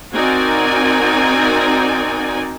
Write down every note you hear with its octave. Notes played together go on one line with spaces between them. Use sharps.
C4 D#4 F#4 A#4 D5 G#5